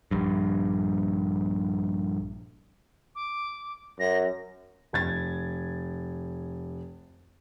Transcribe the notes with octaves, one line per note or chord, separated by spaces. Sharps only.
A#1 G2
D6
F#2 A#6
F1 G#6 A6